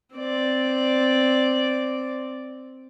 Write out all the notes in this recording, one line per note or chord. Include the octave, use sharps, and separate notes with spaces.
C4 D5